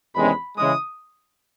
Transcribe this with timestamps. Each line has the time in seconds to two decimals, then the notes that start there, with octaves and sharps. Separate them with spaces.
0.15 E2 C3 D#3 G#3 C#4 B5
0.57 C#3 E3 G#3 D#6